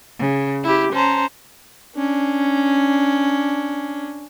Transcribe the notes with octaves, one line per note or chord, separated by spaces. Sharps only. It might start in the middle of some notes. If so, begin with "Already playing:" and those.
C#3
E4 G4
C#4 C5 A5 A#5
C#4 D4